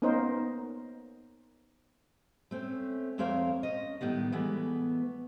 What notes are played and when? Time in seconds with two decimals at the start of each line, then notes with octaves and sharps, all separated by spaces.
0.02 A#3 B3 C#4 D#4 A#4 C5
2.51 A3 C4 C#4
3.18 F2 A3 C4 A#4 C#5 F5
3.63 C#4 D#5
4.01 A2 D#3 G3 B3
4.32 E3 G#3 A3 B3